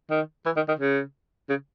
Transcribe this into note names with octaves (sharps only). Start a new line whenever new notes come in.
D#3
E3
D#3
D#3
C#3
C#3